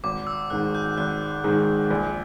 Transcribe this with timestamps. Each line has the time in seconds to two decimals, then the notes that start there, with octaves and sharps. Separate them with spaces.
0.04 G#1 D6
0.27 E6
0.50 G#2 D#3 G#3 F#6
0.75 G6
0.97 G#1 F#6
1.44 G#2 D#3 G#3
1.90 A#1